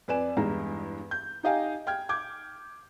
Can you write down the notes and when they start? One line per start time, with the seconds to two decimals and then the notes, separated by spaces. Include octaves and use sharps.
0.08 F2 B4 D5 G#5 E7
0.37 E2 G2 G#3 A#5
1.11 G6
1.43 D#4 G4 D#5 F5 G5 G#5
1.87 G5 F6 G#6
2.09 D6 G6 G#6